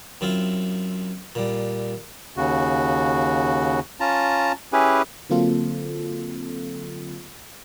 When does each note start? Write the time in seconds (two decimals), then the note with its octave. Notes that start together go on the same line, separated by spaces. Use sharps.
0.21 F#2 C4 E4 F4
1.35 A#2 G3
2.37 D#2 C#3 F#4
4.00 C#4 F4 A5 A#5
4.73 C#4 E4 G4 G#4 B4
5.30 D3 F#3 A#3 C4 F4 A4